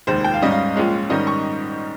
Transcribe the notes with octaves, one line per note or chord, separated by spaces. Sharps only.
F1 D#2 D#3 G#3 C5
G5
F5
G#2 G3 C#4 D#5
F5
A#1 A#2 G#3 C#4
G#2 D#3 G3 C#4 D#5
C#6